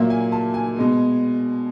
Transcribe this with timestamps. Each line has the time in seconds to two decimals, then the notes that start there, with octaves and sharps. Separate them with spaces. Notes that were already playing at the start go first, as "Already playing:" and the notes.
Already playing: A#2 F#3 A#3 E5
0.10 G#5
0.32 A5
0.54 G#5
0.76 B2 G#3 B3